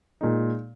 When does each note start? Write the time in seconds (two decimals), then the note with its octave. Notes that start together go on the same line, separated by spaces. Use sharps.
0.21 A#2 G#3 D#4